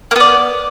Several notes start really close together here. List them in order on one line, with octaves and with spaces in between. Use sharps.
A#3 B3 D5